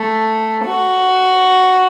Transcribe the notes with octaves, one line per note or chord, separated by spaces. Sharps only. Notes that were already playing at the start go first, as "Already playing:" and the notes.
Already playing: A3
F#4